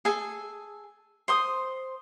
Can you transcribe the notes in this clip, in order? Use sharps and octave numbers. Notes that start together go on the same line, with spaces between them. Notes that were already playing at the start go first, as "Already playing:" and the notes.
G#4 A4 G#5
C5 C6 D#6